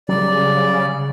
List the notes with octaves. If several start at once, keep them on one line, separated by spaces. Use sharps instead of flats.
C#3 F#3 G3 D5